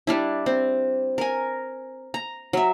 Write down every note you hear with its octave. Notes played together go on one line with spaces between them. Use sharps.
G3 D4 E4
C4
A#4 G#5
A#5
F#3 E5